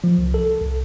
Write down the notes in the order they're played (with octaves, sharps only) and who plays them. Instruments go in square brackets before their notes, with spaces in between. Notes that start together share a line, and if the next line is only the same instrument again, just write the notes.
[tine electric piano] F3
C2
A4
C2